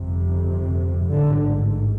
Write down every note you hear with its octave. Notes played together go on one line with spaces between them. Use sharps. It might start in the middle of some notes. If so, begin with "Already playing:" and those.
Already playing: G1 F2 C3
A1 G#2 D3